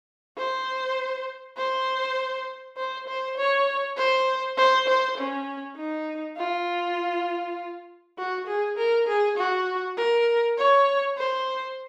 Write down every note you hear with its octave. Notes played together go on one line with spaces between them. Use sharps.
C5
C5
C5
C5
C#5
C5
C5
C5
C#4
D#4
F4
F#4
G#4
A#4
G#4
F#4
A#4
C#5
C5